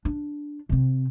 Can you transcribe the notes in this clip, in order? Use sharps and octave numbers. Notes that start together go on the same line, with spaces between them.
D4
C3 C4